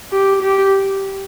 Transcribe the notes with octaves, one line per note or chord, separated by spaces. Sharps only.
G4
G4